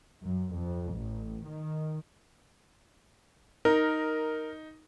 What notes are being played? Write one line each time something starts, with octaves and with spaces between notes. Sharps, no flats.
F#2
F2
A1
D#3
D#4 A#4